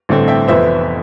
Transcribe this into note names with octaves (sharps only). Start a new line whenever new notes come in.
A1 G2 D3 A3 C4
E5 G5
F1 F2 E3 B3 C5 E5